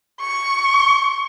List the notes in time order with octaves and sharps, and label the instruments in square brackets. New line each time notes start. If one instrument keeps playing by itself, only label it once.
[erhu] C#6